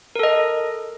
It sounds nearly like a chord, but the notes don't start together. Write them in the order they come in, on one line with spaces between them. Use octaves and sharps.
A#4 A4 D#5